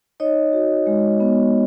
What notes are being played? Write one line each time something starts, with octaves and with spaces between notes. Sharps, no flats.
D#4 C#5 D#5
F#4
G#3
B3